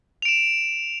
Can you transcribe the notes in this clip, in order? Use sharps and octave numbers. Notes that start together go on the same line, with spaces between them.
D7 E7 F7